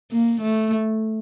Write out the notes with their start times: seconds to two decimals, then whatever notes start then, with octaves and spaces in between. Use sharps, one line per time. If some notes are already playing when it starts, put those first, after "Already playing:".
0.12 A#3
0.41 A3